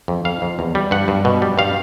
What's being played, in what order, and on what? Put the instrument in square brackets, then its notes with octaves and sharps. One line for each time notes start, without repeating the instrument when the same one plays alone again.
[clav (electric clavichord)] F2
F2 F5
F2
E2
G3
G2 F#5
G2
B2
G3
G2 F5